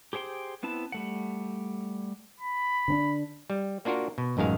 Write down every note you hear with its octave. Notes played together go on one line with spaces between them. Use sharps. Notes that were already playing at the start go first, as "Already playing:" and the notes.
G4 G#4 C5 G5 C6
B3 C4 E4 A5
G3 A3 F#5
B5
D3 C4 D4
G3
A#3 D4 F4 F#4 A#4
B2
A1 F#2 D#3 G#3 F5